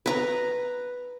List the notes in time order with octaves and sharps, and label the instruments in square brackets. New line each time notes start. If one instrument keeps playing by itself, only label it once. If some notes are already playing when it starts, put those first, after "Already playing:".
[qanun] B4 A#5